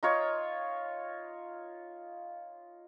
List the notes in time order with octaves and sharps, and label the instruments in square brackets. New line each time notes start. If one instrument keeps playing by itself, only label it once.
[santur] D#4 F4 C#5